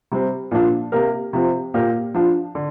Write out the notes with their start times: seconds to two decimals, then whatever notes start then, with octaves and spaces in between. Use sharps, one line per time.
0.12 C3 G3 C4
0.51 A#2 F3 D4 F4
0.92 C3 A#3 G4 A#4
1.33 C3 F3 C4
1.74 A#2 A#3 G4 A#4
2.14 F3 D4 F4
2.55 D3